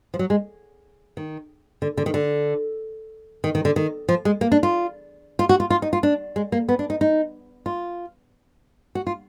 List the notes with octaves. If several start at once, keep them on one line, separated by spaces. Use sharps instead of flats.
F3
F#3
G#3
D#3
D3
D3
D#3
D3
D#3
D#3
D3
D#3
F3
G#3
A#3
D4
F4
F4
F#4
F4
F4
D#4
F4
D4
G#3
A#3
B3
D4
D#4
D#4
F4
F#4
F4